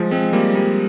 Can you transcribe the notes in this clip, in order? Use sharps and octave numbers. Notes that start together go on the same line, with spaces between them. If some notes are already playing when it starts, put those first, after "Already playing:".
Already playing: F3 G#3
G#3 C4
G3 A#3
G3 A#3